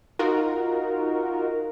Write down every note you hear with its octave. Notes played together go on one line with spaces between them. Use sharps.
D#4 F4 F#4 A#4